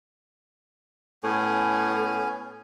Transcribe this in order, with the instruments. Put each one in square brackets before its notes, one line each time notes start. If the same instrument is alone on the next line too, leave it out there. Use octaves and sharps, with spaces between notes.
[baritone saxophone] A2 [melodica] B3 C#4 G#5